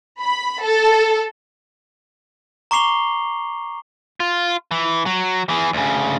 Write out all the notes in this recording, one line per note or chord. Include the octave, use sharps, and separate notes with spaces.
B5
A4
A#5 C#6 D6 C7 F7 G7
F4
E3
F#3
E3 G#4
D2 C#3